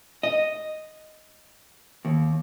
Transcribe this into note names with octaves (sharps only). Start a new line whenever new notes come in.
D#5
D#2